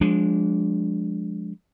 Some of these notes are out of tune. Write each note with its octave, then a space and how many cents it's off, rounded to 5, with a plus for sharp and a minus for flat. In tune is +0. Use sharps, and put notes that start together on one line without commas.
F3 +30 G#3 +0 D4 -10